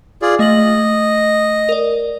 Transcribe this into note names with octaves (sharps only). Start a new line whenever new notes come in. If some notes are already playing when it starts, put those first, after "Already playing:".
F4 G#4 D5
A3 D#5 F#7
A#4 D5